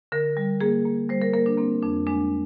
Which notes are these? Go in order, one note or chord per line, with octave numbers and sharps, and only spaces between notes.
D3 A#4
G3
A#3 G#4
A#3
G3 C5
A#4
A#3 A#4
D4
A#3 C4
F2 D4
G#3 D4